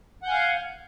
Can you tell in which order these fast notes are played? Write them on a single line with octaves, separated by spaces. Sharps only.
F#5 G6 G#5 F5